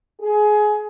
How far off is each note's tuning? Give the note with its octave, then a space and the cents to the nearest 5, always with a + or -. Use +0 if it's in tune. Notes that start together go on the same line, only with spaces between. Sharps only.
G#4 +20